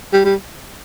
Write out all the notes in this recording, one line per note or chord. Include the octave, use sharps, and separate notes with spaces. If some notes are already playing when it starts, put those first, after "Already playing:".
G3
G3